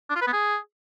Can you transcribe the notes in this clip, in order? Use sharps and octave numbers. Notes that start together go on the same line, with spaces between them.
D4
F4
B4
B3
G#4